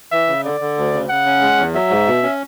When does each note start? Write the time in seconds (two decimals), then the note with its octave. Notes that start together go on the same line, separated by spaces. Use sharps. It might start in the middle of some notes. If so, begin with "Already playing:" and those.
0.11 E3 E5
0.28 C#3
0.44 D3 D5
0.60 D3
0.77 D2
0.93 C#3
1.09 C#3 F#5
1.26 C#4
1.41 G#3
1.58 E2
1.74 F#3 E5
1.90 G#2
2.07 B2
2.23 C#4